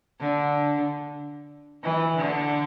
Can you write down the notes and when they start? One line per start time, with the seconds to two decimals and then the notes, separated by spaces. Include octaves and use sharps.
0.21 D3
1.84 E3
2.16 D3